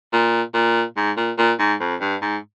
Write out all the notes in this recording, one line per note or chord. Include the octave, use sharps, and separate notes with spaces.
A#2
A#2
G#2
A#2
A#2
G#2
F2
G2
G#2